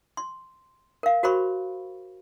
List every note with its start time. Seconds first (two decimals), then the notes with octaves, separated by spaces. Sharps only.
0.17 C6
1.03 A#4 F5
1.23 F#4 A#4 C5 B5 C#6